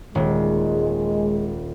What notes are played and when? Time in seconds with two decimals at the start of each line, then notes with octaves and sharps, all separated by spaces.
0.15 D#1 G#3